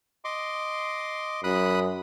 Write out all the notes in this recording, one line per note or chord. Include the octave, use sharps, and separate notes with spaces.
D#5 C6 D6
F#2 B5 D#6 F#6